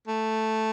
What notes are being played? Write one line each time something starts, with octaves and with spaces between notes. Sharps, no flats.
A3